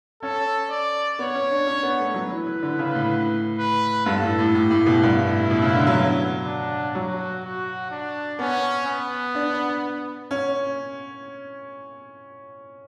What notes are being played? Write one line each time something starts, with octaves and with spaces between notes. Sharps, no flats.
C#4 A4
D5
B3 C#5
C#4
D4
C#4
B3
A3
F#3 B4
E3
E3
D3
C#3
A2
B4
G2 A4
A2
A2
A2 G4
A2
B2
G2 E4
A2
B2
C#3
D3
F#3
D4
F#3 F#4
F#4
D4
B3 C#4
B3
D4
C#4